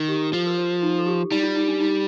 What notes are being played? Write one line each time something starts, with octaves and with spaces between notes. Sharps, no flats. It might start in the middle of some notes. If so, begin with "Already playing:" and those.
Already playing: D#3
G4
F3 A4
A#4
C5
D#4
A4
G4
G3 D#4
F4
D#4
D4
D#4